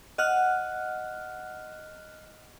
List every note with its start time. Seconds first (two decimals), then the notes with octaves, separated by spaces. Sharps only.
0.18 D#5 F#5 F6 F#6